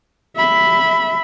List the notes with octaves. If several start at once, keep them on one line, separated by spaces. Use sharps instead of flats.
E5 B5